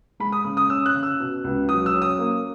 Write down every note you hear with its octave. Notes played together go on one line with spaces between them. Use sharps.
G#3 B5
D#6
C#3 D#6
D#6
C#4 E6
F#6
C#3
E6
B2
C#2
F#3 D#6
E6
C#4
D#6
A#3